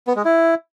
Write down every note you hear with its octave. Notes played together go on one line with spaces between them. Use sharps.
B3
G#3
E4